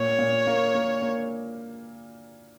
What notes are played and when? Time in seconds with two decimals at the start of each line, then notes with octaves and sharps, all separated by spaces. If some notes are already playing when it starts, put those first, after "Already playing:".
Already playing: A#2 C#5
0.19 A#2
0.47 A#3
0.74 A#3
1.02 A#3